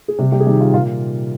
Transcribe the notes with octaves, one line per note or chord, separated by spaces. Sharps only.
G#4
C3 G3 G4
G3 G4
G#4
D#3 G3 G4
F4
A#2 F4